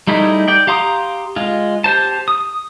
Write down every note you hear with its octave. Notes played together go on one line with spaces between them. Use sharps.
G3 A3 D#4 E4 G#4
D5 G5
G4 F5 A#5 C6 D#6
G#3 F4
G4 C5 A5
D#6